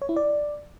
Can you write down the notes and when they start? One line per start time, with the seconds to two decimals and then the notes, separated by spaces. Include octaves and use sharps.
0.02 C#5
0.09 E4
0.16 D5